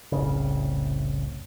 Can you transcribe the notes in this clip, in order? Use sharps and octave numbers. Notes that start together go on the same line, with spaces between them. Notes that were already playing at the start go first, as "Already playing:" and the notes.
F1 C2 A2 C#3